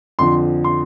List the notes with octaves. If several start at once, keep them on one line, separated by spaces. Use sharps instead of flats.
F2 D3 F3 C6
C6